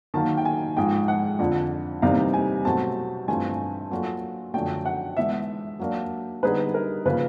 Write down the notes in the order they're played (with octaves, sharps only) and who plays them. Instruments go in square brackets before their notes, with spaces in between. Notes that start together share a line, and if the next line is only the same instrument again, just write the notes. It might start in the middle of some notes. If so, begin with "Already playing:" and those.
[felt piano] D#3 F#3 A#3 [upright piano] A5
[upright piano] G5
G#5
[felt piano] G#2 F3 G#3 [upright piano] G5
[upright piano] F#5
[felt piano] F2 D3 F3
[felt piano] C3 E3 G3 A#3 D#4 [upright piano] F5
[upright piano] G#5
[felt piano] B2 F#3 A3 C4 [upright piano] A5
[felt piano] G2 E3 A3 C4 F4 [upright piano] G#5
[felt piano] F#3 A#3 D4 F4 A4
[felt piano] F#2 D3 F3 A3 [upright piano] G5
[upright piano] F#5
[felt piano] E3 G#3 B3 D4 [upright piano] E5
[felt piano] F#3 A#3 D4
[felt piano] D3 G3 B3 D#4 G#4 [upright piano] B4
[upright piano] A#4
[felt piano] C#3 F3 A#3 [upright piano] B4